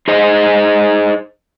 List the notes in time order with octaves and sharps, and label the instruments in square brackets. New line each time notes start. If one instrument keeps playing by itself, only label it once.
[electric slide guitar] D#4 G#4 C5 D#5